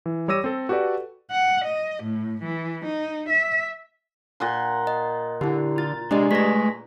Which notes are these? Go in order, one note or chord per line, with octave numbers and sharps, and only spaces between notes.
E3
G3 C#5 D6 E6 A#6 D#7
C4 A4
F#4 G4 A4 B4 D5
F#5
D#5
A2
E3
D#4
E5
A#2 F#5 C6
D#5
D3 E4 G4
F4 A6
C3 G#3 D4 G4 D5 D#5
A3 G#4 B4 A#6 B6